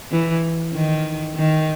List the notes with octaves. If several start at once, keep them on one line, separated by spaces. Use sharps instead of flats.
E3
D#3
D#3